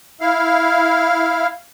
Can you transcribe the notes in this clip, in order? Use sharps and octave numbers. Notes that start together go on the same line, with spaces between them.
E4 F5